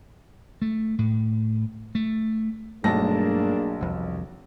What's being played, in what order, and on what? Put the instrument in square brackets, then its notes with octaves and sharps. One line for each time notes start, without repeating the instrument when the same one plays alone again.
[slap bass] A3
A2
A3
[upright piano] B1 A5 A#6 [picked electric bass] G2 A3 [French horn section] A#3 D4 G#4
[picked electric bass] C2 F2